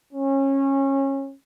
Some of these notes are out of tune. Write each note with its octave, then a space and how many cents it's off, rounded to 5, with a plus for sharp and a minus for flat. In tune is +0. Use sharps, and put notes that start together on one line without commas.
C#4 -25